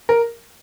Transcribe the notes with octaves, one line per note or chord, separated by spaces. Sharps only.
A#4